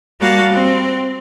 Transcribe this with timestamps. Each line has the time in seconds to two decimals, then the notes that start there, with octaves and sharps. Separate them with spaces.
0.20 G3 A#3 F#4 F5 A5
0.51 C4